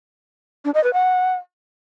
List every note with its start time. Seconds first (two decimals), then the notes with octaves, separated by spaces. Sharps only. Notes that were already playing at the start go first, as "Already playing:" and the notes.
0.65 D4
0.74 D#5
0.84 B4
0.93 F#5